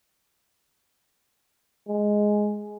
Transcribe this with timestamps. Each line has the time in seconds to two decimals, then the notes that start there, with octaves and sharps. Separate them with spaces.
1.88 G#3